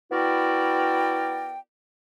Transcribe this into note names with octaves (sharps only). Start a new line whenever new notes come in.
B3 E4 F#4 A#4 D5 G5